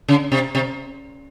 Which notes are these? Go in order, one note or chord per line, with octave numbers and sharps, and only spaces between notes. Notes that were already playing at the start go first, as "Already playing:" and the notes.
C#3
C3
C3